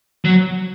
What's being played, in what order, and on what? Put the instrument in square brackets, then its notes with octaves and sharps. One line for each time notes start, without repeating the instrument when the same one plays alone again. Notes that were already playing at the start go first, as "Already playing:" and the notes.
[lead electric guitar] F#3